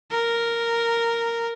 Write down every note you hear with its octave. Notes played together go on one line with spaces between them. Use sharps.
A#4